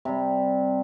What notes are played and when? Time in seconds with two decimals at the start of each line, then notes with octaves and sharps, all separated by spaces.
0.05 C3 G3